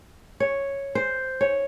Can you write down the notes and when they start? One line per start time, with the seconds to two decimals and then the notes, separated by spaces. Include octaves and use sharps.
0.40 C#5
0.95 C5
1.41 C#5